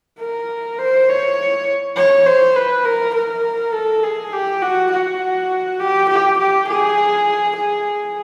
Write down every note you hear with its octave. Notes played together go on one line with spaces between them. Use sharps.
A#4
C5
C#5
C#5
C5
B4
A#4
A#4
A4
G#4
G4
F#4
F#4
G4
G4
G4
G#4
G#4